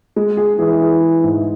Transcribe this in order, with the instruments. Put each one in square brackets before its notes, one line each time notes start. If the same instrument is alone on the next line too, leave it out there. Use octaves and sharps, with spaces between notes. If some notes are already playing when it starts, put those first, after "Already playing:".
[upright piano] G#3
G#4
[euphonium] E3 [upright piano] G#4
[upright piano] G#4
G#4
G#2